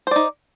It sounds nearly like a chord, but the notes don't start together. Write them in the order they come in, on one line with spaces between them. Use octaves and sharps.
C5 D5 D#4